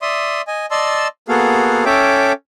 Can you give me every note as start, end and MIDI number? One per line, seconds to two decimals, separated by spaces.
0.02 0.42 74
0.02 0.42 76
0.02 0.42 84
0.02 0.42 87
0.47 0.66 75
0.47 0.66 80
0.71 1.08 74
0.71 1.08 75
0.71 1.08 81
0.71 1.08 84
0.71 1.08 88
1.29 1.85 58
1.29 1.85 59
1.29 1.85 66
1.29 1.85 68
1.29 1.85 69
1.29 1.85 77
1.86 2.33 61
1.86 2.33 69
1.86 2.33 73
1.86 2.33 76
1.86 2.33 79
1.86 2.33 86